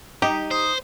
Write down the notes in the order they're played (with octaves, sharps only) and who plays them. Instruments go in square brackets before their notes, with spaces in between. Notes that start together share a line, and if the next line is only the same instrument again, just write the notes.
[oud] D#4 [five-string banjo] G4
[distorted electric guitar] C5 [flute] D#6